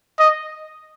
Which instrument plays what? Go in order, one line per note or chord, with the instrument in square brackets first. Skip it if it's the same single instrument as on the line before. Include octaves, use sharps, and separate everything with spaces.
[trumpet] D#5